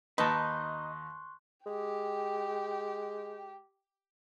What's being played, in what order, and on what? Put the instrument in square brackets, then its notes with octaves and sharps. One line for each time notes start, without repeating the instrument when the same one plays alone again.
[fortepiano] D#2 D#5 [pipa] D#4 [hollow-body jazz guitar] B4 A5 [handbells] C6 C#6 F#6
[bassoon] G#3 [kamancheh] G4 G5